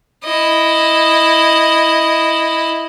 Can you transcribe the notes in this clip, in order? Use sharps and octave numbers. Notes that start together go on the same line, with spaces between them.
E4 D#5